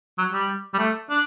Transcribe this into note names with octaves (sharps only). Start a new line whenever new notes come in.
F#3
G3
G3
A3
D4